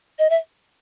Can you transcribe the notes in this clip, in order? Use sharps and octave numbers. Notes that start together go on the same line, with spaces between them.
D#5
E5